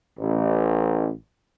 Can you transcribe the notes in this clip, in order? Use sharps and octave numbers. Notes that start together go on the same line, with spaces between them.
A1